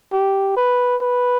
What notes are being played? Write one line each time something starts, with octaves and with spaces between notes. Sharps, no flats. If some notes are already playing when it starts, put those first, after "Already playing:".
G4
B4
B4